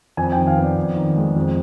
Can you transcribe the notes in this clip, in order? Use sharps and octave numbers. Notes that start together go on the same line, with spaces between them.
F2 G#5
G5
D#3
F5
B3
D5
F2
D#3
G#3
F2